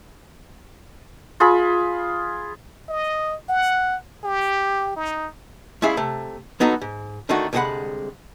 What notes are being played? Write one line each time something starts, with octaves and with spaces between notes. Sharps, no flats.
F4 G#4 B5
D#5
F#5
G4
D#4
G#3 C#4 E4 G#4 E5 F5
C3 A3
F#3 B3 D#4 F#4 A4
G#2
D3 D#3 A3 D4 D#4 F#4
C2 D3 G#3 G#4 F#5 B5